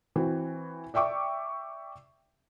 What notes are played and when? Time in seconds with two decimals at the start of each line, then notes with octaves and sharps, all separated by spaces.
0.16 E3 C4 F#4
0.94 D5 E5 G5 C#6 D6